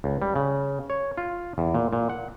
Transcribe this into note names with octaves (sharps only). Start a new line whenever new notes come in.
C#2
G3
C#3
C#5
F4
E2
A#2
A#2
F#5